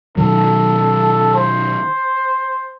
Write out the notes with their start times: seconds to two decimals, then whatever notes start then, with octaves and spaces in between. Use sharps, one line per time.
0.17 B2 D#3 F#3 A4
1.36 C5